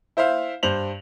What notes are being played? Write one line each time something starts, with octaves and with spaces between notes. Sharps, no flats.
E4 C5 E5 F5
G2 C5 F7 F#7